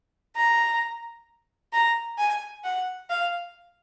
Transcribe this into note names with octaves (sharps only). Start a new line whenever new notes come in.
A#5
A#5
G#5
F#5
F5